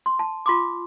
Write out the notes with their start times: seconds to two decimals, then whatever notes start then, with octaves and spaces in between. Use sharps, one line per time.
0.06 C6
0.19 A5
0.46 F4 C6 D6